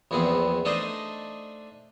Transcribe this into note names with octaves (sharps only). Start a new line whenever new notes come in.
A#1 E2 B3 C4 G#4
A3 D4 D#4 G#4 C5 D#5